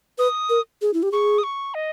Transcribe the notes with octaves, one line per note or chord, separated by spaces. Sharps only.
B4 D#6
A#4
G#4
E4
G4
G#4 C#6
D#6
C#6
D#5